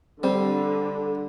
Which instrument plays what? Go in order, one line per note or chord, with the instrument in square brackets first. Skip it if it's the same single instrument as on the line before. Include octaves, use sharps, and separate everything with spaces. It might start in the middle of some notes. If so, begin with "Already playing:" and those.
[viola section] D3 [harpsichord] G3 [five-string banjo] C4